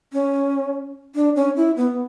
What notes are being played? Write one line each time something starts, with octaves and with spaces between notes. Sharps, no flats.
C#4
D4
C#4
E4
B3